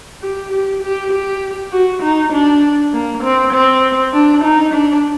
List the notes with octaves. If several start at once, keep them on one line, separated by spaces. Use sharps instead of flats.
G4
G4
G4
G4
F#4
D#4
D4
A#3
C4
C4
D4
D#4
D4